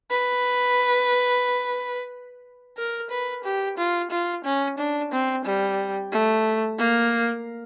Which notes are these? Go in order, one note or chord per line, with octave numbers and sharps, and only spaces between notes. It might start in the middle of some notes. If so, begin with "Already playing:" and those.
B4
A#4
B4
G4
F4
F4
C#4
D4
C4
G3
A3
A#3